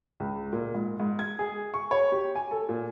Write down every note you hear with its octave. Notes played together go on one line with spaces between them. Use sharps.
C#2
A#2
G#2
G#2
G#6
G#4
C#6
C#5
G4
G#5
A4
A#2